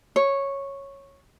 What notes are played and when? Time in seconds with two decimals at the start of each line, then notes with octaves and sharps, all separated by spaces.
0.16 C#5